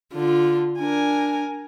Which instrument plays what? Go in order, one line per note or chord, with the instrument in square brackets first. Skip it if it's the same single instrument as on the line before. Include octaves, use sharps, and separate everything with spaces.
[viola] D3 F4
[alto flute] D4 [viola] A#4 G#5